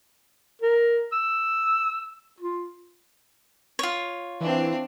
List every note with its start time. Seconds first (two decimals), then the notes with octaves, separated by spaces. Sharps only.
0.62 A#4
1.12 E6
2.40 F4
3.79 F4 C#5
4.41 E3 C4 D4